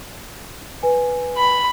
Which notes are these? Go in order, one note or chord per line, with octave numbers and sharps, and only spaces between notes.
B4 G#5
B5